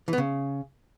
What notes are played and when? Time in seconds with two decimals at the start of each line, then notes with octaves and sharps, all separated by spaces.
0.08 E3
0.13 B3
0.18 C#3